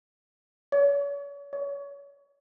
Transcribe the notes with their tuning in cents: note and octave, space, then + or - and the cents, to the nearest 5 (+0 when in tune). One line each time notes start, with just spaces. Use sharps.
C#5 +40
C#5 +30